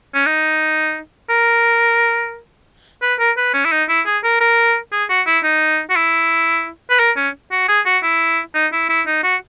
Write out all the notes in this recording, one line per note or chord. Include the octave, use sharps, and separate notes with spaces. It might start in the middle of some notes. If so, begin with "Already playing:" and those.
C#4
D#4
A#4
B4
A#4
B4
C#4
E4
D#4
E4
G#4
A#4
A#4
G#4
F#4
E4
D#4
F#4
E4
B4
A#4
C#4
F#4
G#4
F#4
E4
D#4
E4
E4
D#4
F#4